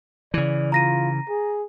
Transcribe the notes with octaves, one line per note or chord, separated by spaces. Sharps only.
C#3 E3 D5
F4 A#5 A#6 D#7
G#4